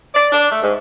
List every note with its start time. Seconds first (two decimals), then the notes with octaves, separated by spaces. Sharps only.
0.15 D5
0.33 D4
0.51 A3
0.63 G#2